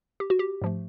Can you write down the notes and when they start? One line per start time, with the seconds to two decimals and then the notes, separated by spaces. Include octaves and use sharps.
0.20 G4
0.30 F#4
0.39 G4
0.62 G#2 F3 A3